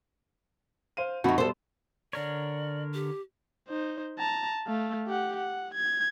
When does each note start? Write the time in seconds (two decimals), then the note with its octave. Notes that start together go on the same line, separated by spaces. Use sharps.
0.97 C5 F5 D#7
1.24 F2 D#4 F#4 B5 C#6
1.38 B2 G3 A4 C5
2.13 D3 A#4 C#5 D5
2.94 G4
3.68 D#4 C5
4.19 A5 A#5
4.67 A3 F5
5.07 G4 F#5
5.36 F#5
5.74 G#6